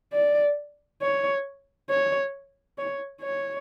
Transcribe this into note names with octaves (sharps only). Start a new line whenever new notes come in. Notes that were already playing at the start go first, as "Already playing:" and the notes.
D5
C#5
C#5
C#5
C#5